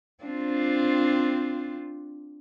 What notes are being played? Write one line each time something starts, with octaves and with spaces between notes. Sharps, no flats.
C4 D4 F4